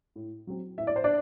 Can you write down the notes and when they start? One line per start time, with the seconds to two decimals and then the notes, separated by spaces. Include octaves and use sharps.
0.16 A2
0.47 F#3 C4
0.78 A2 E5
0.87 D5
0.96 C5
1.04 D4 D5